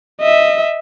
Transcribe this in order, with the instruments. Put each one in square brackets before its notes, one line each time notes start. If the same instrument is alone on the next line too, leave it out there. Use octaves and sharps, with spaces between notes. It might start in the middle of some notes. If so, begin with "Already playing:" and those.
[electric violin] D#5 E5